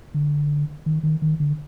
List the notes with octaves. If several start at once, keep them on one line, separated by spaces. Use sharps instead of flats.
D3
D#3
D#3
D#3
D3